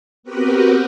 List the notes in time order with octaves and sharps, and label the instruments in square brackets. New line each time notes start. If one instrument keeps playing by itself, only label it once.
[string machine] B3 C4 F#4 G4 A#4 B4